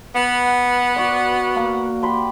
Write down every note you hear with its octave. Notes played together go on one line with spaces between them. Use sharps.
B3 F#5
F#4 D5
A#3
G4 B5 C6